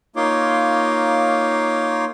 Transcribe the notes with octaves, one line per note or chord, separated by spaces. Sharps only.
A#3 D#4 F4 C#5 C6 D6